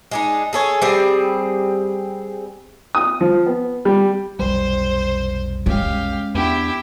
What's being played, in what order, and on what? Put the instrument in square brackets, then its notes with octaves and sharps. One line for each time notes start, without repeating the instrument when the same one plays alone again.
[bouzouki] G#3 D4 D#4
G#4 A4 C#5
G3 C4 G#4
[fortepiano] D#6
F3
B3
G3
[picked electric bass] F1 B1 G3 [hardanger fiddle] C5
[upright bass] G#3 C#4 [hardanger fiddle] G4 F5
[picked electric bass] E2 B3 D4 [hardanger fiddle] E4 G4